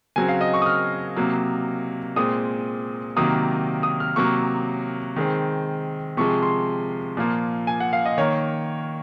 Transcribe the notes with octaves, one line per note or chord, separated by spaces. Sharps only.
C#3 F#3 C4 G#5
F5
D#5
C#6
D#6
F6
C3 F#3 A#3
A#2 G#3 C4 D#6
C3 D#3 F#3 A#3 D#6
D#6
F6
C3 F#3 A#3 C#6
D#3 G#3 C4
C3 F3 G#3 C#6
C6
A#2 F3 A#3
G#5
F#5
F5
D#5
D#3 A#3 C#5